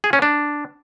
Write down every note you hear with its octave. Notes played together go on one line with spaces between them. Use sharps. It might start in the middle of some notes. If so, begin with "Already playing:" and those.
G#4
C#4
D4